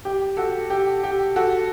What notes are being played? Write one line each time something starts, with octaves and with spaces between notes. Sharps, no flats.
G4
F#4 A4
G4
G4
F#4 A4